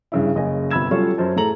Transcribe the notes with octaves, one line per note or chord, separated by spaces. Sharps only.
G2 C#3 E4
F#1 C#3 D#5 G#5
G1 C3 B5 E6 G#6 E7
F#3 G3 C#4 F4 A4 C#5
F#2 C5 A5
A2 G#4 A4 A#5 F#7